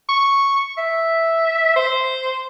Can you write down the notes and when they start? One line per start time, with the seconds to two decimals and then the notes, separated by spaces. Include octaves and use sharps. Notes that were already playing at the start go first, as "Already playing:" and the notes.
0.09 C#6
0.78 E5
1.76 C5